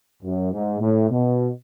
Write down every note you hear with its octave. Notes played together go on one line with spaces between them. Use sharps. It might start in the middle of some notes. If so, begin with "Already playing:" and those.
F#2
G#2
A2
B2